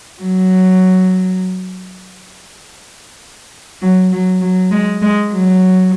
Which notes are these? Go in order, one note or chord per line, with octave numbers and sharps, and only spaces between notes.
F#3
F#3
F#3
F#3
G#3
G#3
F#3